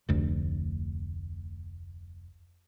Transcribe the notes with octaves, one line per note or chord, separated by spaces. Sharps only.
F1 D2